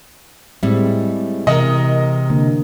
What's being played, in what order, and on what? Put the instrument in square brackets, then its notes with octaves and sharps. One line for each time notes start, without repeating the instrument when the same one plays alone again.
[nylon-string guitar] A2 G3 [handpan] G#3 C4 E5
[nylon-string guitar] C3 [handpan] E3 [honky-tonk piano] A#4 D#5
[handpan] D3 A#3